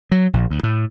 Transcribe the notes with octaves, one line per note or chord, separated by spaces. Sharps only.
F#3
A#1
D2
A2